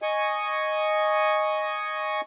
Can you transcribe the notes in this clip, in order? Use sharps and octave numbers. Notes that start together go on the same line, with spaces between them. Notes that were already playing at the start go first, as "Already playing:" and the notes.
D#5 G#5 C#6